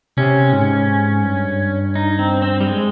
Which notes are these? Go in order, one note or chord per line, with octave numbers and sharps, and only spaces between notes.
C3 C#4
G#2
G2
D#4
C4
C4
G3
G#3